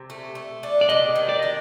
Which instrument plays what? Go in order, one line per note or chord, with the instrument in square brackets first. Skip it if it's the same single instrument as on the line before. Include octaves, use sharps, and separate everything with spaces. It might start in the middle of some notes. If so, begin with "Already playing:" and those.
Already playing: [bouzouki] C3
A3
A3
D4
[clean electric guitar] D5
[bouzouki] C3 [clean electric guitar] D#5
[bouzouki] D#3
[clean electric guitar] D5
[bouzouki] D4 [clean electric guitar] D#5